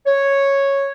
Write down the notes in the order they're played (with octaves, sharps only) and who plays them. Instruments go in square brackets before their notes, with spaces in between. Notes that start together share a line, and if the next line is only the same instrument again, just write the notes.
[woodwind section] C#5